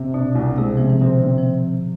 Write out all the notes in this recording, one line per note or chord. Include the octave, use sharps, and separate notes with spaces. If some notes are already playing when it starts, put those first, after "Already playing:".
Already playing: C3
B2 D4
C2
C3 G#3
C3 F3
E3
B2 D3 C4
C3
F3